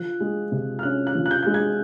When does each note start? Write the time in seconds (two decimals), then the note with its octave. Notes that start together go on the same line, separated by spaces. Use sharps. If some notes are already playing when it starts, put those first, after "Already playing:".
Already playing: F3 F#6
0.20 G#3
0.52 C3
0.79 F6
0.83 C#4 F#6
1.07 F#6
1.15 F3
1.26 F#6
1.31 G6
1.43 G#3 G6
1.54 G#6